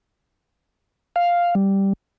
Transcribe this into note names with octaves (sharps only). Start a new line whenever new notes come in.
F5
G3